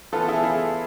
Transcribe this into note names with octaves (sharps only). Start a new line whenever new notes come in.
E3 B3 F4 A4
E4 G#4
E4 G#4